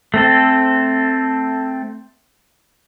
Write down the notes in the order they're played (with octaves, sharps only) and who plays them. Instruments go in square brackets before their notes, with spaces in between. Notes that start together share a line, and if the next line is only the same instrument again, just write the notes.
[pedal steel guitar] A3 C4 A4